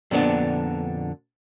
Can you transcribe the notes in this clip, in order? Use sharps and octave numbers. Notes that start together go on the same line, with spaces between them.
F2 A#2 D3 B3 D4